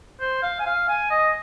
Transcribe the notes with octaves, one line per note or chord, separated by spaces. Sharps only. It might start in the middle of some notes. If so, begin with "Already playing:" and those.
C5
F5
G#5
F5
G#5
D#5